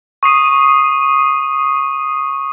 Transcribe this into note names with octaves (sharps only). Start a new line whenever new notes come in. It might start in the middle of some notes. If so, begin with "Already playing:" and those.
C#6 D#6 C7 D#7